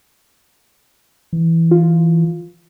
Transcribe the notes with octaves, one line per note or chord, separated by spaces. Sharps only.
E3
F4